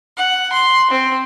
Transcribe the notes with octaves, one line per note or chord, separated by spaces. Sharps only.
F#5
C6
C4